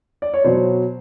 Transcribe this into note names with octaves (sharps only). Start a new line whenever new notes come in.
D5
C#5
B2 F#3 C5